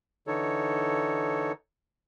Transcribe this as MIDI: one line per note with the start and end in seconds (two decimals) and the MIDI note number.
0.27 1.52 50
0.27 1.52 52
0.27 1.52 63
0.27 1.52 69
0.27 1.52 73